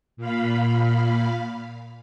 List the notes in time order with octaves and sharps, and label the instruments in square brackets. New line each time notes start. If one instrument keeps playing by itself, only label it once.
[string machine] A#2 F5 B5